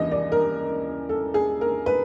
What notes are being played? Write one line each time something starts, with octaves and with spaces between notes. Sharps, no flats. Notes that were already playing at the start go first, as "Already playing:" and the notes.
Already playing: D#2 C#3 E3 D#5
D5
A#4
A4
G#4
A#4
B4